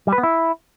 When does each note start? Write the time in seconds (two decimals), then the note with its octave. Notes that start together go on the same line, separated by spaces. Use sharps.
0.07 G3
0.13 B4
0.18 B3
0.23 E4